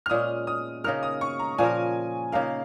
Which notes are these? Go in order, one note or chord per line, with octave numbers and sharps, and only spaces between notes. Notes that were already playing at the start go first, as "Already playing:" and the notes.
F6
A#2 G#3 C#4 D#6
D#6
C#3 A#3 D#4 A#4 F6
D#6
C#6
A#5
A#2 F3 C#4 A#4 G#5
C#3 A#3 D#4 A#4 F5